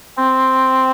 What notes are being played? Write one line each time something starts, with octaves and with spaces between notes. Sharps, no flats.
C4